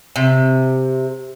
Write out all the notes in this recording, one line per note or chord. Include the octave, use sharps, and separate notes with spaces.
C3